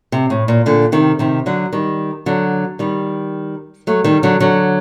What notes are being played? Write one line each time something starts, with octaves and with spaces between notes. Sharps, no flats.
C3
A2
A#2
A#2 D3
C3 D#3
C3 D#3
D3 F#3
D#3 G3
D3 F#3
D#3 G3
F#3 A3
D#3 G3
D3 F#3
D3 F#3